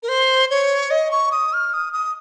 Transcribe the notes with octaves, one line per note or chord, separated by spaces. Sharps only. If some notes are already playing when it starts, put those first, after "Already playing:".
A#4
C5
C#5
D#5
C#6
D#6
F6
D#6
D#6